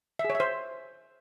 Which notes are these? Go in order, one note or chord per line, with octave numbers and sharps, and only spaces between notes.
E5
G#4
C#5
E5
C5